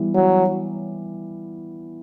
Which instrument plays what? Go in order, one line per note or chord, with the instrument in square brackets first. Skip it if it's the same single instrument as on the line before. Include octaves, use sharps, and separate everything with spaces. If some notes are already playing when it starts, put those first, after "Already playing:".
Already playing: [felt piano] E3 G3 B3
[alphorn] F#3